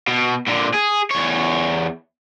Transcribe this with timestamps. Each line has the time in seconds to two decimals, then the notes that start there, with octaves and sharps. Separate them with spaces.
0.08 B2
0.48 A#2 D3
0.74 G#4
1.11 E2 C#5